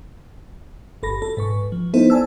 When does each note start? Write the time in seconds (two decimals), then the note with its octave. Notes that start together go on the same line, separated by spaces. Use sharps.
1.03 G1 A4 B5 A#6
1.22 A4
1.37 G#2 B4 C#6
1.72 F3
1.94 B3 D#4 E4 A4 C5
2.10 D5 G#5 A5 E6